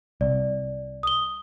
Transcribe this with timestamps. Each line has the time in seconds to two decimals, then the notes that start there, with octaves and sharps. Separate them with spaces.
0.21 C2 D5
1.03 D#6 G7